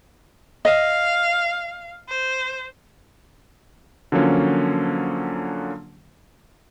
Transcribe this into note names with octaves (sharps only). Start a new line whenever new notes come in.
D#5 F5
C5
D3 F3 F#3 A#3 C#4